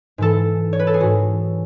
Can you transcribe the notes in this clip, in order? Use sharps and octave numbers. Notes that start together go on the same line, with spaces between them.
G#2 E3 A4
C#5
B4
A4
G#4
G#2 E3 F#4